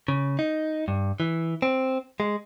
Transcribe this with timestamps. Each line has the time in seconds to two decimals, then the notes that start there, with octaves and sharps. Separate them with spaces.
0.08 C#3
0.39 D#4
0.88 G2
1.20 E3
1.62 C4
2.20 G#3